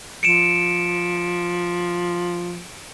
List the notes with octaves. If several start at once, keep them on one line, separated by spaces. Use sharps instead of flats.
F3 C#7 D7 E7